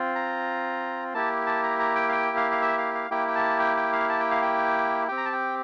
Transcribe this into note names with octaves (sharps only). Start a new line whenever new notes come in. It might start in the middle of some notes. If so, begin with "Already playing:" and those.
Already playing: C4 F4
A#5
A#3 E4 G4 A5
A5
A#5
A#5
G5
F5
G5
F5
F5
E5
F5
F5
A#3 E4 G4 G5
G5
A5
G5
G5
F5
A5
G5
F5
G5
C4 G4 G5
A#5
A5
G5